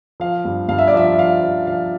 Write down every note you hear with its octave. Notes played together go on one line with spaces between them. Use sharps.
F3 F5
G2
G2 F5
E5
D5
F3 E5
F3 F5
F3
F3 F5